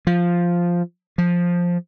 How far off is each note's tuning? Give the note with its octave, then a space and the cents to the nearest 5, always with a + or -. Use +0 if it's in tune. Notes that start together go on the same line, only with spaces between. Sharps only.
F3 +0
F3 +5